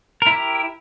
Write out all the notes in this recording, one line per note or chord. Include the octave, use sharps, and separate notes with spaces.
E4 G4 A#4